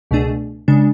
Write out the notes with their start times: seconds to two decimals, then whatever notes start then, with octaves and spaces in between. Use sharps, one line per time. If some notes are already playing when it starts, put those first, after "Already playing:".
0.11 C#2 B2 A3 D4 G#4
0.68 C#3 G#3 D4